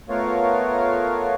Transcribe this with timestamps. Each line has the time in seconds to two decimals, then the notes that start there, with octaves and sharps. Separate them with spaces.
0.09 A3 B3 F4 A#4 C#5 F5